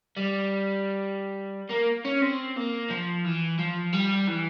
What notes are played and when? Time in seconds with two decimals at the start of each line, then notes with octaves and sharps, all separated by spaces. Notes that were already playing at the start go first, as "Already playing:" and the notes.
0.17 G3
1.70 A#3
2.05 C#4
2.22 C4
2.56 A#3
2.90 F3
3.24 E3
3.59 F3
3.93 G3
4.28 E3